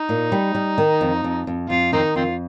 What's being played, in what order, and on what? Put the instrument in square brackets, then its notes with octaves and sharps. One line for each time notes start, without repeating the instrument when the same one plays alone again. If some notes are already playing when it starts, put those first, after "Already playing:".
Already playing: [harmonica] D#4
[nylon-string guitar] A#2
G3
G3
D#3
F2
F2
F2
[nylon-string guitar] F2 [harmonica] F4
[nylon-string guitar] D#3 [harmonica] C4 D#4
[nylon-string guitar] F2 [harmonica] C4 F4